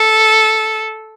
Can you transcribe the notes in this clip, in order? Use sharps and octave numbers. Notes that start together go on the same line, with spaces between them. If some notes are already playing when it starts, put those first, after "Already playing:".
Already playing: A4